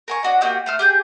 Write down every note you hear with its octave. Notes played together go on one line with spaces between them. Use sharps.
A#4 G#5 C#6
D4 F#4 D#5
A#3 F#4 G4 D#5
A3 C5 F6
G4 G#4 G6